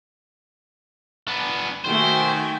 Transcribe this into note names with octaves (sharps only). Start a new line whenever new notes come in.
B3 D4
D#3 A3 F#4 C5 G5 G#5